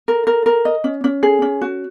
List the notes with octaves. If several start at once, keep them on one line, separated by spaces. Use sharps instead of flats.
A#4
A#4
A#4
D#5
C#4
C#4
G#4
C#4
F#4